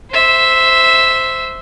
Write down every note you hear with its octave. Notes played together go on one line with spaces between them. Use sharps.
C5 E5